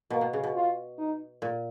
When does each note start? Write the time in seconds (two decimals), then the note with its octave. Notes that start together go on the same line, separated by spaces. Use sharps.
0.10 B2 A#3
0.21 B2
0.33 C#3
0.43 B2
0.55 F4
0.98 D#4
1.42 A#2